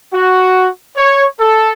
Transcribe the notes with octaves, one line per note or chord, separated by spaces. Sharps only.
F#4
C#5
A4